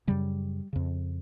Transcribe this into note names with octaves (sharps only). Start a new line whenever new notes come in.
F#2 C#3 G3
F2 C#3